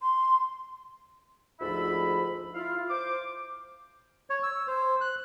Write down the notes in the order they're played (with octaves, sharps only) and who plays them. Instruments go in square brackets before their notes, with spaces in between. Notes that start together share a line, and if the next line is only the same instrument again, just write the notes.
[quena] C6
[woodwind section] D2 G#2 F3 F4 E5 B5
E4 F4 F5
C5 D6
[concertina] C#5
E6
C5
F#6